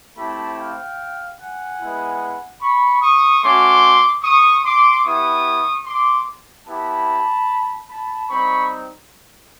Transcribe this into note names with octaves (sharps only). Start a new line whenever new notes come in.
A3 C4 E4 G4 A5 B5
F5 G5
F#5 G#5
G#3 B3 E4
B5 C#6
C#6 D#6
A3 C#4 F#4 C6 D6
C#6 D#6
C6 D6
B3 E4 G4 C#6 D#6
C6 D6
B3 E4 G4 A5 B5
A5 B5
G3 C4 D#4 B5 C#6